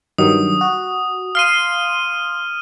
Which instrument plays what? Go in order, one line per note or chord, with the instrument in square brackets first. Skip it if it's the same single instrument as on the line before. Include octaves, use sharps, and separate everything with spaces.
[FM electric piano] G2 D#3 F#3 [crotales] D#6
[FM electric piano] F#4
[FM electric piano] F5 C6 [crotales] F6 D#7